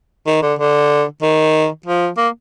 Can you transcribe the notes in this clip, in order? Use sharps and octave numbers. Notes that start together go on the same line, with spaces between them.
D#3
D3
D3
D#3
F3
A#3